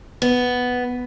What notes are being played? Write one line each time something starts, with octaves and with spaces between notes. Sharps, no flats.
B3